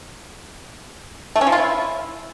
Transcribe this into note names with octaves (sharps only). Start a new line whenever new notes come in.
A3
C#4
F3
F4
E4